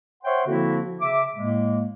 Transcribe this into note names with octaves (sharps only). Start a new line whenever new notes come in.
C5 C#5 E5 F#5 G5 C6
D3 F3 A#3 C4 E4 F#4
C#3 E5 D6
A2 G#3 A#3